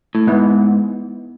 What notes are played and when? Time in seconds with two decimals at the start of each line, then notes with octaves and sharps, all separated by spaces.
0.15 A2
0.27 G#2 B3 E4 B4